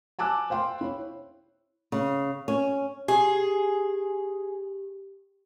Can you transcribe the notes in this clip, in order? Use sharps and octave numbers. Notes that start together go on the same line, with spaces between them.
G#5 A5 D6 E6 F#6
C5 F5 G5 C6
E4 C#5
C#3
C#4
G4 G#4